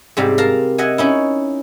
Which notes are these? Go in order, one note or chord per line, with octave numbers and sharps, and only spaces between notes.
G#2 C3 G3
A#4 F5 A5 A#5
D#5 E5 F#5 G#5
C#4 D#4 E4